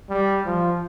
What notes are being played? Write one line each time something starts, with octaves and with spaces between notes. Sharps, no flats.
G3
F3